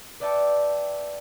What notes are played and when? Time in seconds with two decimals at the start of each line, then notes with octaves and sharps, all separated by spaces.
0.20 B4 D5 E5 G5 A5 C#6